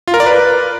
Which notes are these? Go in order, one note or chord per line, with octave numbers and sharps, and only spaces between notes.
F4
A#4
D5
B4